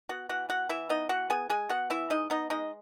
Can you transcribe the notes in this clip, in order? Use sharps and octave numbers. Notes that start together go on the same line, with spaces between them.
B3 F#4 F#5
E3 F#4 F#5
B3 F#4 F#5
E3 E4 E5
B3 D#4 D#5
E3 F#4 F#5
B3 G#4 G#5
G#3 G#4 G#5
B3 F#4 F#5
E3 E4 E5
G#3 D#4 D#5
B3 D#4 D#5
G#3 D#4 D#5